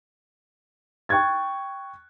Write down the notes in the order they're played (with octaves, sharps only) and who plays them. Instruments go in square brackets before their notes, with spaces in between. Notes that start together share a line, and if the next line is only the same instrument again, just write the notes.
[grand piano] G5 C#6 F#6 G#6 A6